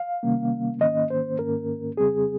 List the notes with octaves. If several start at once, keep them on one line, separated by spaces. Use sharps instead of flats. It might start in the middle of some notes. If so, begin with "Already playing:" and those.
Already playing: F5
C3 D#3 G3 A#3 C#4
G#2 D#3 A#3 C#4 D#5
C5
G#2 D#3 A#3 C#4 A#4
F2 C#3 G3 C4 G#4